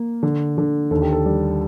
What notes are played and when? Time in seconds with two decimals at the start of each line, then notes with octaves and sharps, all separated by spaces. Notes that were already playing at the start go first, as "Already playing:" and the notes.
Already playing: A#3
0.23 D3
0.58 D3
0.91 D#2 A4
1.02 G4
1.13 A4
1.26 G3